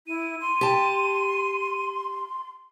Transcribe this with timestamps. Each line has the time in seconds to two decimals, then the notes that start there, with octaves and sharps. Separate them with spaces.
0.07 E4 D#7
0.41 C6
0.61 G4 A5